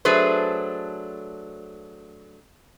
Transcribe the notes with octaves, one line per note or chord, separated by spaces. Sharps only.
F#3 A3 D4 G#4 B4 C5